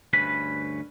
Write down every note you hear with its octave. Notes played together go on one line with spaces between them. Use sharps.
D2 G2 C#4 B4 B5